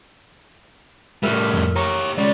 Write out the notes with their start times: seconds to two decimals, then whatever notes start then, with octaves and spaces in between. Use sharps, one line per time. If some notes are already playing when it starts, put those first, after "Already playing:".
1.23 A2 G3 A3 A#4 E6
1.53 F2
1.76 G4 C#5 A#5
2.18 G#3 C#4 D5